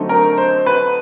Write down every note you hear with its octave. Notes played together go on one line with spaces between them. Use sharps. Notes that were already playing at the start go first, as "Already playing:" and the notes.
Already playing: D3 F#3 A3 C4 D#4
A#4
C5
B4